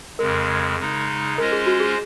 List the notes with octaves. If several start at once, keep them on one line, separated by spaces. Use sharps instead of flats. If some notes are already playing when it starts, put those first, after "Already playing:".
F2 C#3 G#3 A#4
C#3 G#3 D#4
G#3 C#4 F4 A#4 C5 D#5
G#4
F#4
G#4